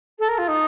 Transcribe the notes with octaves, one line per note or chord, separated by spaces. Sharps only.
A4
A#4
F4
D#4